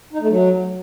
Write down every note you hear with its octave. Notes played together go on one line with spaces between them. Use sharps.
D#4
A3
F#3